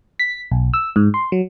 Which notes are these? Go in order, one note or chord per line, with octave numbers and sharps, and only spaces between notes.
B6
B1
E6
G#2
C6
F#3